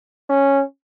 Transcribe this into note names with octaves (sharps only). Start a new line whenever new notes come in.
C#4